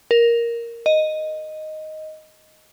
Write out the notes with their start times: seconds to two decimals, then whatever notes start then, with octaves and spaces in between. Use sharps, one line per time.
0.11 A#4
0.86 D#5